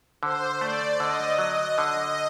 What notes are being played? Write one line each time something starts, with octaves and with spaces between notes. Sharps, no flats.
D3 C5
A3 D5
D3 D#5
F#3
D3